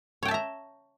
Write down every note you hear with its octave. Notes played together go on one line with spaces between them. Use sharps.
C#5 E5 G5 A5 A#5